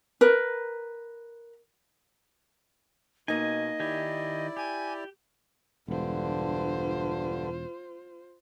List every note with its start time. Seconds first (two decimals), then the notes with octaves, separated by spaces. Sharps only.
0.21 A#4 B4
3.28 B2 A#3 D#4 D#5 G#5
3.80 D#3 E4 G4 D5 G#5
4.57 G4 G#5
5.88 E1 G2 D3 F4 C5